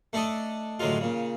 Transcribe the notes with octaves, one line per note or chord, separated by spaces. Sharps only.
A3 D4 A4 D#5
A2 D3 F#3 G#3 F4
A#2 C#3